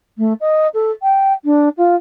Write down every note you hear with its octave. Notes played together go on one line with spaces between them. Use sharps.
A3
D#5
A4
G5
D4
F4